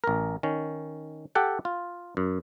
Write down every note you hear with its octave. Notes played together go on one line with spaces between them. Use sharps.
A1 A#4
D#3 C#4
G4 A4 F#5 G5
F4
F#2